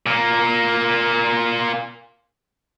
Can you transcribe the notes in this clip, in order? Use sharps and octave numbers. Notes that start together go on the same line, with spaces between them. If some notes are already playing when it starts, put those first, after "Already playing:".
A#2 A#3